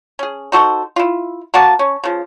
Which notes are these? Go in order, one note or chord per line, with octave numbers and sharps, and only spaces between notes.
C#4 G#4
D#4 F#4 A4 C5
E4 F4
A#3 F#4 F#5 A5
C#4
C#3 F3